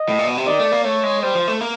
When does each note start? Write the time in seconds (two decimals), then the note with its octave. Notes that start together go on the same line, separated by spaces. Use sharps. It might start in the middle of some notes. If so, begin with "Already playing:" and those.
Already playing: D#5
0.09 A2
0.19 A#2
0.27 B2
0.37 C3
0.46 D#3 D5
0.59 A3
0.72 A#3
0.84 A3 C#5
1.03 G#3
1.23 G3 C5
1.35 F3
1.48 A3
1.61 A#3